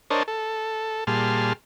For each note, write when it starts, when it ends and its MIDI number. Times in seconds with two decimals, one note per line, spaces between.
0.10 0.23 62
0.10 0.23 70
0.10 0.23 72
0.10 0.23 73
0.10 0.23 75
0.10 0.23 81
0.28 1.04 69
1.07 1.53 46
1.07 1.53 55
1.07 1.53 68
1.07 1.53 81
1.07 1.53 84
1.07 1.53 89